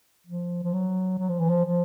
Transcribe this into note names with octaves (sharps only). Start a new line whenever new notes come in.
F3
F3
F#3
F#3
F3
E3
F3
F3